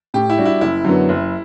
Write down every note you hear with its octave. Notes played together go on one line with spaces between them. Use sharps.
A2 G4
E4
G3 D4 F#4
E4
F#1 E4
F#2 D3 F#3 B3
F#1